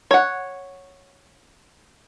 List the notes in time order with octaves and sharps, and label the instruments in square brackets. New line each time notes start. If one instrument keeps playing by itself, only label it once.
[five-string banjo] C#5 F#5